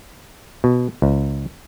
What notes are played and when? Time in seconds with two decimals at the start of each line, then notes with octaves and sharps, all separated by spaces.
0.64 B2
1.02 C#2